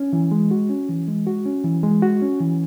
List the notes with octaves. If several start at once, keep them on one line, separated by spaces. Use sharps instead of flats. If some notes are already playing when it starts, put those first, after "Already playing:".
Already playing: C#4
E3
G#3
F#4
C#4
E3
G#3
F#4
C#4
E3
G#3
F#4
C#4
E3